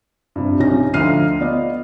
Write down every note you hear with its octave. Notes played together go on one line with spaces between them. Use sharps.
G2 C3
B1 C3 C#4 A#6
D2 F3 D#4 F6 C7 D#7
B3 F4 D5 D#5